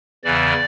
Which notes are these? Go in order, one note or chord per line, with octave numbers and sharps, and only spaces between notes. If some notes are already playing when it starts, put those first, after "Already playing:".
E2 C#3 E3 D5